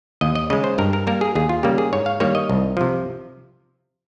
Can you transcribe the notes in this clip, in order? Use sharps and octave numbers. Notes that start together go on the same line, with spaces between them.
D#2 D#5
D#5
C#3 G#3 D#5
C5
G2 A#4
A#4
G3 A#3 A#4
G#4
D#2 G#4
F4
C#3 G3 A#3 G4
G#4
G#2 C#5
F5
D#3 G3 A#3 C#5
D#5
C2
C3 F3